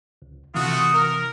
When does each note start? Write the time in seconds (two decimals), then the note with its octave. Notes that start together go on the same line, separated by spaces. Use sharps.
0.22 C#2
0.55 C3 E3 A3 F4 F#4 D#6
0.94 A#4